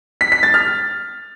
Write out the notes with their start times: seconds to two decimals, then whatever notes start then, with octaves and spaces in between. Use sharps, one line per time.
0.21 B6
0.32 B6
0.43 A6
0.54 F6